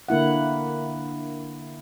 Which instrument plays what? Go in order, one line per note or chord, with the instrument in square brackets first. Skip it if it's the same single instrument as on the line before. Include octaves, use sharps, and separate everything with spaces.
[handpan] D3 A#3 E4 F#5